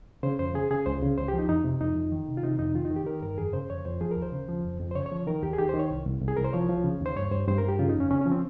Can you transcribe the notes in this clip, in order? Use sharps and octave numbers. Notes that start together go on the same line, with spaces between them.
C#3 C5
F2 C5
C#3 G#4
C#3 G#4
C#2 C5
C#3
C#2 C5
G4
F3
D#4
F2 D#4
C3
F2 D#4
F2
D#3
C3
F4
C3 D#4
F2 D#4
D#3 F4
D#4
D#3
G4
D#3 A#4
G2 A#4
F2 G#4
C#3 C5
F2 C#5
F2 C5
F3 G#4
A#4
D#2
C5
C#3
F3
F2
F2
C5
C#3 C#5
C#5
F3
D#3 A#4
D#2 G4
G#4
D#3 G4
C5
D#3
C#5
C2
C2
C2
G#4
C2 A#4
C5
F3 C#5
F3
C#3
D#2
C5
G2 C#5
G2 C5
G2 C5
A#4
G2
G4
C#3 F4
D#4
F2
C#4
C#3 C#4
C#4
F3
C4